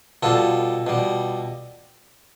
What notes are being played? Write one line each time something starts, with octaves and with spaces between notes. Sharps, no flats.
B2 G3 F4 A4
B2 G3